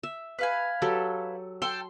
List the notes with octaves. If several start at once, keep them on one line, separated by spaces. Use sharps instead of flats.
E5
B4 F5 G#5
F#3 G4 A4
A4 G5 C6